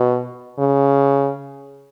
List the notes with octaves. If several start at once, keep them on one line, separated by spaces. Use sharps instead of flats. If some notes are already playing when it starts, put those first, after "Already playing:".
Already playing: B2
C#3